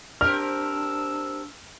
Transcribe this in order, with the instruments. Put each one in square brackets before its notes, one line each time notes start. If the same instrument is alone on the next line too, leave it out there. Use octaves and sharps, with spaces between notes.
[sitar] C4 G4 A#4 [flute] D4 [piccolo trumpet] E6 [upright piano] F6